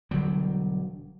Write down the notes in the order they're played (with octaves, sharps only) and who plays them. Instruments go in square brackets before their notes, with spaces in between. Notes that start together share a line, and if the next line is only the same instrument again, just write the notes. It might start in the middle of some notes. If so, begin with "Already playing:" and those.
[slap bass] E1 D3 F#3 G3